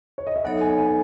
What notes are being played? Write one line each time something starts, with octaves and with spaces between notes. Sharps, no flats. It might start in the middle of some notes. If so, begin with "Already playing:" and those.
C#5
D#5
E5
F#3 B3 D#4 A4 C#5 F#5
G#5
G#5